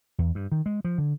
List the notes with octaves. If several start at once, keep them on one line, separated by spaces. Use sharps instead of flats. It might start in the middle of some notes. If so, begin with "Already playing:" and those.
E2
G2
D#3
G#3
F3
D3